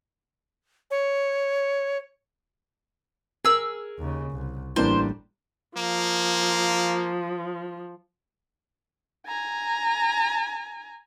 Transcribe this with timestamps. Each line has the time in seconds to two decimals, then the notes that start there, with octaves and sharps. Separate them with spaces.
0.91 C#5
3.45 G#4 A#4 E6
3.99 D#2 C#3
4.32 C2
4.76 A1 E3 G3 A#3 D4 C5
5.77 F3 A#3
9.27 G#5 A#5